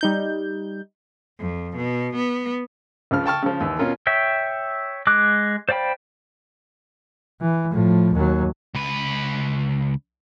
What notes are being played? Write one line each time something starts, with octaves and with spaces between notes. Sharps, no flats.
G3 D#4 G6
F2
B2
B3
C#2 C#3 F3 F6
G5 A5 C#6 F6
C#3 F3
D#2 E3
B2 C#4 F4 A#4
C#5 E5 G5
G#3 D6 F#6
C5 D5 F5 G5 B5
E3
A2 F3
D#2 F#3
C#2 B4